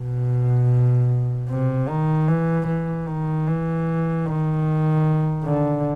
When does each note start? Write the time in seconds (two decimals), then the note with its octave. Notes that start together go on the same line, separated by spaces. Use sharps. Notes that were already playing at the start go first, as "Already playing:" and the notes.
Already playing: B2
1.49 C3
1.89 D#3
2.28 E3
2.67 E3
3.07 D#3
3.47 E3
4.26 D#3
5.44 D3